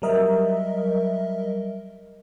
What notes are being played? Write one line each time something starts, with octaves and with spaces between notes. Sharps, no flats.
F#3 G3 A#4 D#5 E5